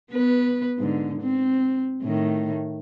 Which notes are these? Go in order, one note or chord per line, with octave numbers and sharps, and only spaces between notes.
B3 B4
G#2 D3
C4
A2 D#3